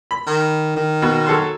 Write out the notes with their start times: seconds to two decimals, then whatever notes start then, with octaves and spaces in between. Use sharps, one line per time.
0.11 B5
0.27 D#3
0.77 D#3
1.02 B2
1.27 F#3 A4 C6